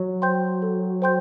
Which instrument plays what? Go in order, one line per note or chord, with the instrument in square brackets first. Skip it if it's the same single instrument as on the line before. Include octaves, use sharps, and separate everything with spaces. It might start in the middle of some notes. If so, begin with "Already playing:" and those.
Already playing: [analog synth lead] F#3
[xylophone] C5 G5 C6 G6
A4
C5 G5 C6 G6